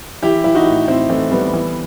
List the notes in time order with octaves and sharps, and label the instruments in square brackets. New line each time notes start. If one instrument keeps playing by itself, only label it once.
[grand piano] E3 E4 G4
E3 E4
D#4 F#4
A2
A2 C4 E4
E3 A3 C4
E3 G3 B3
E3